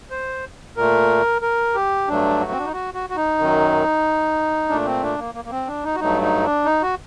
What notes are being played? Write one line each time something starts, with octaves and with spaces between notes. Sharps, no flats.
C5
A#2 A3 A#4
A#4
G4
G2 F#3 A3 D4
F#4
C4
D4
D#4
F#4
F#4
F#4
D#4
F#2 D#3 F#3
A#2 A3 D4
C4
D4
A#3
A#3
A#3
C4
D4
D#4
F#4
G2 F#3 A3 D#4
D#4
D4
D#4
F#4